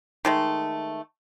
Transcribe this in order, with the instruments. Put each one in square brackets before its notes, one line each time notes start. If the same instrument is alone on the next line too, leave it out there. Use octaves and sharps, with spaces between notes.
[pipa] D#3 G#3 A3